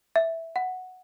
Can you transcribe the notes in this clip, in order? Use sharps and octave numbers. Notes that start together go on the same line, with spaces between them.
E5
F#5